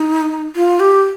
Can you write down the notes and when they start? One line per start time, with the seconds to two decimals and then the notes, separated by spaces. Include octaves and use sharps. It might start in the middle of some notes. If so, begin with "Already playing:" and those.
Already playing: D#4
0.56 F4
0.80 G4